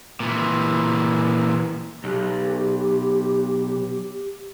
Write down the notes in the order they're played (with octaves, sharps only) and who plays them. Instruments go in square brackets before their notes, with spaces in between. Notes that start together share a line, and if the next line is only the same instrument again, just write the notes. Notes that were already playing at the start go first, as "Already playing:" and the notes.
[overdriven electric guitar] A#2 E3
[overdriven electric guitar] B1 [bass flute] G4